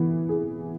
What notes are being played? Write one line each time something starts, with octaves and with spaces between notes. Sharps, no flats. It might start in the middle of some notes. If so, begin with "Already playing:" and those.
Already playing: E3 B3
G#4